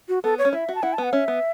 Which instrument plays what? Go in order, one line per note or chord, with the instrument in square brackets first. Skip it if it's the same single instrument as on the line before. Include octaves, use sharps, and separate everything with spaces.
[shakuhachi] F#4
[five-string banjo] B3 [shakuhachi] A4
[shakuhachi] C#5
[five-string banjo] C#4
[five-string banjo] E4 [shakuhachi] E5
[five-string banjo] F#4
[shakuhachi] A5
[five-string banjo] E4 [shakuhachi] F#5
[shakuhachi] A5
[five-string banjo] B3 [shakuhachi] F#5
[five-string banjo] C#4 [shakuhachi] E5
[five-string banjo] B3